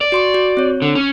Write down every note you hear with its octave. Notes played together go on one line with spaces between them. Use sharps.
D5
F#4 C6 C#6
F#4
C4 C#5
D3
C#4